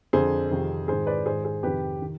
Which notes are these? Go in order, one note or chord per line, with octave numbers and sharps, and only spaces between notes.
F2 D3 G#4 C5
F2 C3 D#3
G#2 D#3 G#4 C5
B4 D5
G#2 D#3 G#4 C5
G#4 C5
F2 C3 D#3 G4 B4
D#3